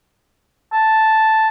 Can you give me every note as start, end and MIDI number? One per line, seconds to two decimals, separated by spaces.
0.73 1.48 81